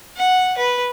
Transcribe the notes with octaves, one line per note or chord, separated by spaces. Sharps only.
F#5
B4